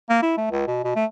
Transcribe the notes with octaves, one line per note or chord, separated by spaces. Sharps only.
A#3
E4
A3
C#2
B2
B2
A3